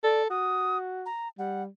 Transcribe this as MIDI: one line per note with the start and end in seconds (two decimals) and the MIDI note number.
0.04 0.29 69
0.04 0.23 74
0.30 1.06 66
0.30 0.77 87
1.06 1.28 82
1.39 1.67 55
1.39 1.63 78